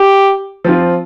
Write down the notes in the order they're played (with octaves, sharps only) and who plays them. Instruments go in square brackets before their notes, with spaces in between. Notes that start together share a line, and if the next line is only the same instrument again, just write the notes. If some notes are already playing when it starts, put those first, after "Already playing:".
Already playing: [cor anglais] G4
[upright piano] F3 C4 F4